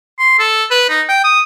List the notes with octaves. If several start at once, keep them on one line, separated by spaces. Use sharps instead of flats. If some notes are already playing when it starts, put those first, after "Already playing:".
C6
A4
B4
D#4
G5
D#6